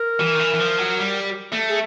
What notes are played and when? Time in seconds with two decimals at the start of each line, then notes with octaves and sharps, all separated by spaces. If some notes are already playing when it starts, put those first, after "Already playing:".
Already playing: A#4
0.20 E3
0.35 D#3
0.39 E3
0.54 E3
0.60 F3
0.79 F#3
0.99 G3
1.53 A3
1.69 G#4